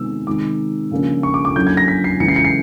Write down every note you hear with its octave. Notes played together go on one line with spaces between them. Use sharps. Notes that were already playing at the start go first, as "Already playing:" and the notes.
Already playing: C3 D#3 G#3 B3 E6
C3 D#3 G#3 D6
C#3 F3 A#3 D4
C#6
D6
D6
D3 F#3 A#3 C#4 E4 G6
G#6
A#6
B6
C7
C#3 E3 G#3 C#7
C7
C#7
C7